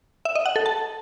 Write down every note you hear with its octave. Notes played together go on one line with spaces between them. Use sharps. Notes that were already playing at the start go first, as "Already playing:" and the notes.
E5
D#5
F#5
A4
A5